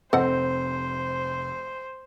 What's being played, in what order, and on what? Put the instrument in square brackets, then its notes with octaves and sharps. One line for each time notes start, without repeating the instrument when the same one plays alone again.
[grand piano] F1 [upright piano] C4 [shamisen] A4 D#5 F#5 [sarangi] C5